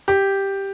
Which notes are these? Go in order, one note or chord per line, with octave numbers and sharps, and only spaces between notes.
G4